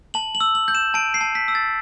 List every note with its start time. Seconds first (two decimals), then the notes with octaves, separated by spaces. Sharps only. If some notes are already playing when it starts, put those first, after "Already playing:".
0.14 A5 F#7
0.35 F#7
0.41 E6
0.55 F#7
0.68 G6
0.75 E7
0.94 A5 D7
1.14 C7
1.21 A5
1.35 B6
1.48 E6
1.55 A6